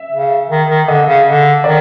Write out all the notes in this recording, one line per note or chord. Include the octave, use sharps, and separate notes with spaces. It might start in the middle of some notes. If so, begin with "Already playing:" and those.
Already playing: E5
C#3
D#3
D#3
D3 D#5
C#3
D3
D#3 D5